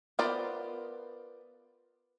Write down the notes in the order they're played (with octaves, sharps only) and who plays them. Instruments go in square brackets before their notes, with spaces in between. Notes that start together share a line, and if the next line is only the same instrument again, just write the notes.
[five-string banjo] B3 F4 A#4 C5 D5